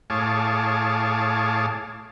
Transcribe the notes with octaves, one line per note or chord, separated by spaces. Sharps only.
A2 G#4 C#5 F5 A5 D6